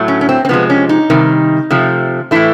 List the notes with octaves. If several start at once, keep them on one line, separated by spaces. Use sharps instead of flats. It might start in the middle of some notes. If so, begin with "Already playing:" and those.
Already playing: A2 F#3 A3
C#4
C#4
C4
C4
C3 F3 G#3 B3
C#4
D#4
C3 D#3 G3
C3 F3 A3
A2 E3 A3 E4